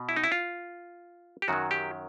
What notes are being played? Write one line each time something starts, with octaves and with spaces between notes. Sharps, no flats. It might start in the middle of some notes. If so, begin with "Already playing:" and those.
Already playing: B2
E4
D#4
E4
F4
G4
F#2 D#3 F#3 F#4
G4